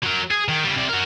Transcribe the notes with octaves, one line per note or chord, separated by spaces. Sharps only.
F#3 A#4
G#4
D#3
C#3 G3
C3 D5
F#4 A#4